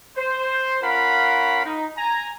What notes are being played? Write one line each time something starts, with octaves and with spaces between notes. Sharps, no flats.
C5
C#4 F4 A#4 F5 F#5 B5
D#4
G#5 A#5